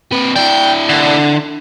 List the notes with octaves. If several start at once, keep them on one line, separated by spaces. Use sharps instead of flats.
C3 B4
D4 E4 G5
D3